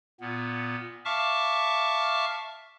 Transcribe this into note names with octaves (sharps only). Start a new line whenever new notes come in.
A#2 B3
E5 F5 A5 C#6 D6 F6